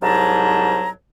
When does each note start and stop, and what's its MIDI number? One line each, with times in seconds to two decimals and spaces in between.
0.02 0.89 36
0.02 0.89 44
0.02 0.89 54
0.02 0.89 81
0.02 0.89 82